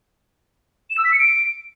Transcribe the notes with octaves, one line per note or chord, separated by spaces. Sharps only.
E7
E6
B6
C#7
D7